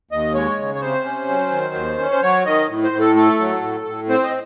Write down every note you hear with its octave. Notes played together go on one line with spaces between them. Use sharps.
D#2 D#5
G#3 C#5
C#3
C#5
C3 C5
C#4
F#3
D#3
D#2
C#4
C5
F#3 C#5
D#3 D#5
A2
C5
A2
A4
A3 A4
F#3
A2
A2
C4 C5
D#5